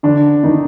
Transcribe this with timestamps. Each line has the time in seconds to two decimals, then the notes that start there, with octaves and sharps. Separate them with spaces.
0.03 D3 D4
0.43 D#3 D#4